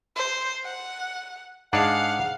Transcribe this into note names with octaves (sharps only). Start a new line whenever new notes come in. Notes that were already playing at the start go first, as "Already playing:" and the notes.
C5
F#5
G#2 D4 G#4 F5 F#5